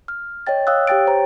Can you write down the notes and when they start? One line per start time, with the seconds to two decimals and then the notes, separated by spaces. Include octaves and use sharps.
0.08 F6
0.47 C#5 D#5 G5 A6
0.67 C#5 F5 D#6 E6 F#6
0.87 G4 C#5 G5 A6 D7
1.07 C5 A#5